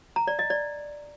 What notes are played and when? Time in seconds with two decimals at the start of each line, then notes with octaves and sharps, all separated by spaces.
0.16 A#5
0.27 D5
0.39 D#5
0.50 D5